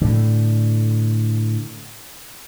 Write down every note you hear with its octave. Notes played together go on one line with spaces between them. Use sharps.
A2 D3